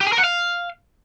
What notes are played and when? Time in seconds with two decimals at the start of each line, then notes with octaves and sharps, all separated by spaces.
0.01 G4
0.07 G#4
0.12 A#4
0.18 F#5
0.24 F5